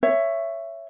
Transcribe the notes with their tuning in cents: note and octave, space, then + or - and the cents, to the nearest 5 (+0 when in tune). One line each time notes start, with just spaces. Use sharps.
C#5 +0 E5 +15